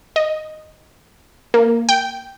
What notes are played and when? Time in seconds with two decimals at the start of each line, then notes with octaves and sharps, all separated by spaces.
0.16 D#5
1.54 A#3
1.89 G5